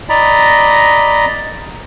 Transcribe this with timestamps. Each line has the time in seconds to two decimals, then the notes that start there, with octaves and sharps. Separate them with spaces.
0.09 D5 D#5 A#5 B5